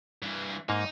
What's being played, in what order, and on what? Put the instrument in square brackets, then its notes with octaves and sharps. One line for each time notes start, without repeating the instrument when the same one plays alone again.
[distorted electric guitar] G2 E3
[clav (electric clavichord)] G#2 A#3 [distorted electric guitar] D#4